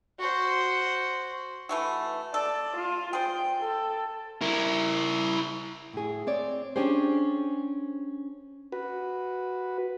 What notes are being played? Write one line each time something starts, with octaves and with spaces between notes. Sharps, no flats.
F#4 C5
E3 A3 F#4
A4 D5
F4
G#4 C5 G5
A4
E4 A#4
A2 G#4
C4 C#5 D5
C#4 D4 G4 G#4 C5
F#4 B4